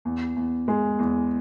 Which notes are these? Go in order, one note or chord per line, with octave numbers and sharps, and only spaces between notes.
E2
E2
G#3
E2